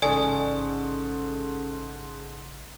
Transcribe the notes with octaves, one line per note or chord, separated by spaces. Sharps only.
A1 G#2 C#3 C#4 A4 D5 G#5 D#6